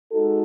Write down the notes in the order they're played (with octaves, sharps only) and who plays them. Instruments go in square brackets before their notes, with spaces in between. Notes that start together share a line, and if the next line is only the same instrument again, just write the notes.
[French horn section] G#3 D#4 F#4 A4